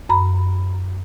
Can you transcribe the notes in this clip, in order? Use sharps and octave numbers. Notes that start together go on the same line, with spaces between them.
F#2 A#5 B5